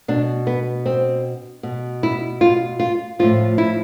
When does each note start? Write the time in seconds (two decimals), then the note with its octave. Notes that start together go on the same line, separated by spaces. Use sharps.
0.08 B2 D4
0.47 B3
0.86 C4
1.63 B2
2.03 E4
2.41 F4
2.80 F4
3.19 A2 F3 F4
3.58 E4